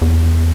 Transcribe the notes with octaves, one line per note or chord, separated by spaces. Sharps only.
E2